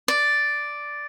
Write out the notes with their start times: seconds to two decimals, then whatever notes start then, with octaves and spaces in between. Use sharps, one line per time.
0.08 D5